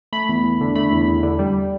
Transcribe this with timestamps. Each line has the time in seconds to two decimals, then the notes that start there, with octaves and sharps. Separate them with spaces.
0.13 A3 B5
0.29 E2
0.44 E2
0.61 D3
0.76 A3 B5
0.92 E2
1.08 E2
1.23 D3
1.39 G3